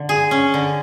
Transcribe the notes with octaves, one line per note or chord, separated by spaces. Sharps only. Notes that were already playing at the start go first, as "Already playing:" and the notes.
Already playing: D3
G#4
C#4
D3